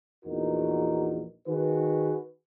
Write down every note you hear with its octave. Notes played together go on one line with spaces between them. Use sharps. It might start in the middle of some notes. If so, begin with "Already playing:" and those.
A#1 E2 B3 D#4 F#4 A#4
D#3 F#4 G#4 B4